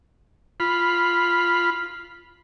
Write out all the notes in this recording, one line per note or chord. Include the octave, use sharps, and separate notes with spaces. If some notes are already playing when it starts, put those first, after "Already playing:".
F4 B5